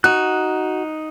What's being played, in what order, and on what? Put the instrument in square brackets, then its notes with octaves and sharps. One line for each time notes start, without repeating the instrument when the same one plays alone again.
[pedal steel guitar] D#4 F#6 [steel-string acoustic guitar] F#4